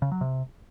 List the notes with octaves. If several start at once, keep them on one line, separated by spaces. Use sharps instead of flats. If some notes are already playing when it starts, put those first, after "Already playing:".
C#3
F#3
C3